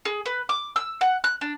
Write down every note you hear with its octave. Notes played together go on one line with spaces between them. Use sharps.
G#4
B4
D6
E6
F#5
F#6
D4